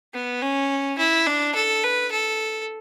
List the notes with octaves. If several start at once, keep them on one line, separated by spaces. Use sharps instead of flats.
B3
C#4
E4
D4
A4
B4
A4